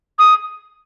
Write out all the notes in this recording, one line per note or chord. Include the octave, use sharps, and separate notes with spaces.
D#6